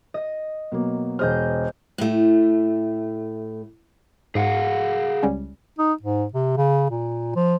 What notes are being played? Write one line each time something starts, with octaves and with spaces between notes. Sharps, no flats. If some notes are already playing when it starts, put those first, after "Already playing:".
D#5
B2 F#3 A#3
E1 G#4 C5 D#5 F6 G6
A2 A3
G#2 G#4 F5 F#5
C#2 G3 C#4
D#4
G#2
C3
C#3
A#2
F3